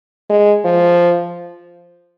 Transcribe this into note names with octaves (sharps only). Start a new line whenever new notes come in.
G#3
F3